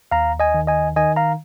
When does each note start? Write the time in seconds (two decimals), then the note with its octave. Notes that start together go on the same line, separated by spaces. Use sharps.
0.11 D#2 F5 A#5
0.40 D#5 G#5
0.54 D#3
0.67 D#5 G#5
0.96 D#3 D#5 G#5
1.17 F5 A#5